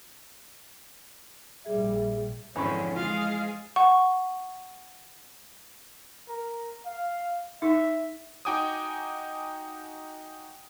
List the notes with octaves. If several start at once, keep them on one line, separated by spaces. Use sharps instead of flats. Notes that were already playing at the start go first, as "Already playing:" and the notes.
A#1 G3 G#4 E5
G#1 F2 D3 E3 C4 C#4 B5 C#6
G#3 F4 G#4 F5
F#5 C#6
A#4
F5
D#4 E5
D#4 F#4 G5 G#5 D6 D#6